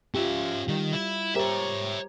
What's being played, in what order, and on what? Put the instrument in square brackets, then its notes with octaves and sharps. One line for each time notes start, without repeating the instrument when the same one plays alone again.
[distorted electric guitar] C#4 E5 [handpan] F4 G4
[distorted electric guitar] D#3 [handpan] G3
[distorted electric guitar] E4
[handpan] G4 A#4 C5 [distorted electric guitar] C#5 E5